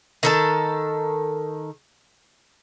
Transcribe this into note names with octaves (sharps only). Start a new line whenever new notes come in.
D#3 A4 A5